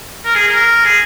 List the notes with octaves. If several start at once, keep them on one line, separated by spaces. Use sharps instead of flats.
A#4
G#4
A#4
G#4